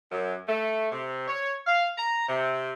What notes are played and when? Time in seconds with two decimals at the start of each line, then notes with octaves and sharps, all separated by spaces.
0.11 F#2
0.48 A3
0.92 C3
1.28 C#5
1.67 F5
1.98 A#5
2.28 C3